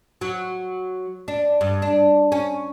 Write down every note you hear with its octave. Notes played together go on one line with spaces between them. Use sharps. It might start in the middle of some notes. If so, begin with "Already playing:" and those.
F#3
D4
G2
D4
C#4